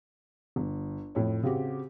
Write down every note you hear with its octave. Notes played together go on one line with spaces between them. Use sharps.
G1
F2 A2 C#5
C#3 C4 F#4 G4